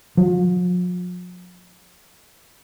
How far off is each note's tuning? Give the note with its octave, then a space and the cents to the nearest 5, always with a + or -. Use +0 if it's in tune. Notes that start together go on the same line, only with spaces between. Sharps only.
F3 +45